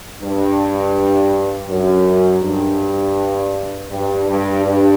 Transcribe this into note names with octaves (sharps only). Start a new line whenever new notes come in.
G2
F#2
G2
G2
G2
G2